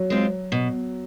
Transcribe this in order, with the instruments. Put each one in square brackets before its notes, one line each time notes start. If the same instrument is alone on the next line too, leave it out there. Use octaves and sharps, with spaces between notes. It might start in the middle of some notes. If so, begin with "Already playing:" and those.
Already playing: [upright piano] F#3
[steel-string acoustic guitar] G#3 C4 F4
B2